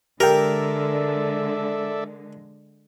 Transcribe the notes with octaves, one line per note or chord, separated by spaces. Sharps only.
D3 G#3 G4 A4 A#4 D5 E5 G5